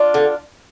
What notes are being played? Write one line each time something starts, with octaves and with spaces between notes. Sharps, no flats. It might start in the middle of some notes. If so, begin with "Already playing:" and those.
Already playing: D4 F4
D3